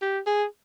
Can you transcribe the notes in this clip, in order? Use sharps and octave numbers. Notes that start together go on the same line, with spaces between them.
G4
G#4